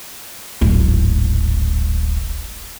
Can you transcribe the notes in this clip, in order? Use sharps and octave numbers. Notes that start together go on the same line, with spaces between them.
D1 G#1